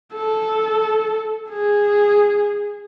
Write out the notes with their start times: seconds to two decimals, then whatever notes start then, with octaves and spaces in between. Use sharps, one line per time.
0.14 A4
1.50 G#4